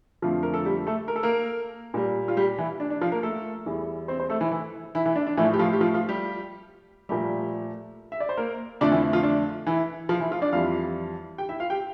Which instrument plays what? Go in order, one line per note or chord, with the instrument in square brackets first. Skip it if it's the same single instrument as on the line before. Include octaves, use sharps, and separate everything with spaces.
[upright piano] F2 D3 F3 A3 F4
A#4
A4
G3 G4
A3 A4
A#4
A4
A#3 A#4
A#2 G3
F4
G3 G4
E3 E4
D4
D4
F3 F4
A#3 A#4
A3 A4
E2 E3 G3
C4 C5
C4 C5
A3 A4
E3 E4
E3 E4
E3 E4
E3 E4
D4
D4
A2 E3 F3 A3 E4
G4
F3 F4
G4
F3 F4
F3 F4
G3 G4
A#2 F3 G3 A3 G4
E5
D5
C5
A#3 A#4
F2 D3 F3 A3 D4 D5
E3 E4
F3 F4
D4
E3 E4
F3 F4
E3 E4
F3 F4
D4 D5
F2 E3 G3 F4 F5
G4 G5
E4 E5
F4 F5
G4 G5